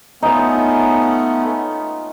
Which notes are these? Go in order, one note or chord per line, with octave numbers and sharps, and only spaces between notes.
A3 B3 C#4 D#4 F4